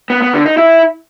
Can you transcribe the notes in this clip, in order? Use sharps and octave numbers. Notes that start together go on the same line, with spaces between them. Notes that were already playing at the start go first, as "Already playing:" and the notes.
B3
B3
D3
D#4
E4